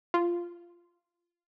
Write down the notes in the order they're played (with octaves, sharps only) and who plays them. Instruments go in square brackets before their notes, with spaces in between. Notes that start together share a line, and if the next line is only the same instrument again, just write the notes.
[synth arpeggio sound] F4